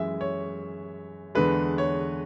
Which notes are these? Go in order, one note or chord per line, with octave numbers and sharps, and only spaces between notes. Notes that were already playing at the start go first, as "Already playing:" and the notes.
Already playing: F#2 E3 G#3 E5
C#5
E2 D3 G#3 B4
C#5